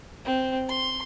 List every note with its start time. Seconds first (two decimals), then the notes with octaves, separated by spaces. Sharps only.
0.25 C4
0.69 C6